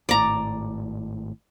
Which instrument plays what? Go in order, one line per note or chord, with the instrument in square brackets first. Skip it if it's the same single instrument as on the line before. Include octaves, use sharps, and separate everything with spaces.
[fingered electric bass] G#1 A2 [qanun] D5 A#5